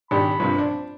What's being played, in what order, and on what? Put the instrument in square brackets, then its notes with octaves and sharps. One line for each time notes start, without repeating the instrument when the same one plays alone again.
[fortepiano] G#1 D4 G4 [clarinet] B5
[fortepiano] A#1 G2 C3
C4 D4